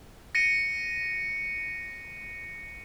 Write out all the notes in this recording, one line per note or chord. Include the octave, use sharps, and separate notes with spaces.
A#6 C#7 D#7